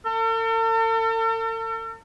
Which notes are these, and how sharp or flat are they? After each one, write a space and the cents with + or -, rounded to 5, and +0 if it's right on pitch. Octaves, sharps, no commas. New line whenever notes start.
A4 +45